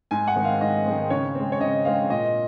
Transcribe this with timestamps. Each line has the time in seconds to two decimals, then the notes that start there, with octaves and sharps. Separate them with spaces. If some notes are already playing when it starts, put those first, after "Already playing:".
0.11 G#2 G#5
0.28 F#5
0.36 D#3 G#3 C4
0.45 F5
0.61 G#2 D#5
0.86 D#3 G#3 C4
1.10 C#3 C#5
1.35 G#3 C4
1.52 C#5
1.60 C#3 D#5
1.85 G#3 C4 F5
2.10 A#2 D#5